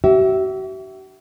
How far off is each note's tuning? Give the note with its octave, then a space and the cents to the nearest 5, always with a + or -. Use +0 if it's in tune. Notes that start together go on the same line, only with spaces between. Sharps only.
F#4 +45 E5 +0